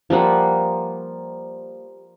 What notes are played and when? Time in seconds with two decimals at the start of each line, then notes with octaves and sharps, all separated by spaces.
0.10 F3 G3 A#3 F#5